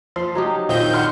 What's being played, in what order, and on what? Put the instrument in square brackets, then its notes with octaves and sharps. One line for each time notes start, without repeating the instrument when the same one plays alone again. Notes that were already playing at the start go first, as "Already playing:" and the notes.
[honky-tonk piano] F3 [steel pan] C6
[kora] F#3 D#4 G4
[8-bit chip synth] A#1 D#3 G6 [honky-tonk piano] C4 [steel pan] F4 D#5 E5
[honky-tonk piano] F#5 C6 F6